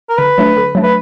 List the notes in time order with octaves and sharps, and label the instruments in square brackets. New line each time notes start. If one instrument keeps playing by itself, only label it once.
[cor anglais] A#4
[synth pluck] D3 [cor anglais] B4
[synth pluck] F#3 A3 D4
D3
F#3 A3 D4
[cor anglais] B4